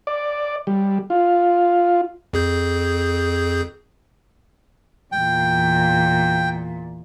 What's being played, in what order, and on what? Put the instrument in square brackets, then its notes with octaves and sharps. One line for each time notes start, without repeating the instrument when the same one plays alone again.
[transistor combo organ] D5
G3
F4
[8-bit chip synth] F2 G#4 G6
[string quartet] E2 A#2 [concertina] G5